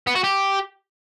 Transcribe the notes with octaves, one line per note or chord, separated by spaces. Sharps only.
B3
F#4
G4